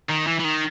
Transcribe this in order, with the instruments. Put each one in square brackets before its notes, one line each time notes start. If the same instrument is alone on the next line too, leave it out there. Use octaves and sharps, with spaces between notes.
[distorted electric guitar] D#3
E3
E3
D#3